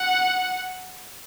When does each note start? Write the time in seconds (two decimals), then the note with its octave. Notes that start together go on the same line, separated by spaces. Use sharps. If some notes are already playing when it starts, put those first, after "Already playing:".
Already playing: F#5